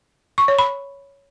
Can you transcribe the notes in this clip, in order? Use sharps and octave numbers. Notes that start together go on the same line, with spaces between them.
C#6
C#5
B5